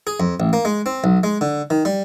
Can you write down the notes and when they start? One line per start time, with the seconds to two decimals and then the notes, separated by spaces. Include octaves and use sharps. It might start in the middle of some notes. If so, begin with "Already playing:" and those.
0.07 G#4
0.20 F2
0.40 A1
0.53 A#3
0.65 G#3
0.86 C4
1.04 B1
1.23 G#3
1.41 D3
1.70 D#3
1.85 G3